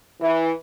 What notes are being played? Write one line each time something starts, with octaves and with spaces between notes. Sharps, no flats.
E3